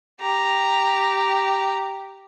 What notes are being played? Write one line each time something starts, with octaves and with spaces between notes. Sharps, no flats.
G4 A#5